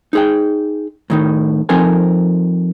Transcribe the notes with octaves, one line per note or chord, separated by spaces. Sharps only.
D#4 G#4 G5
A2 D#3 D#4
F3 C4 D#4 A4 A#4 G#5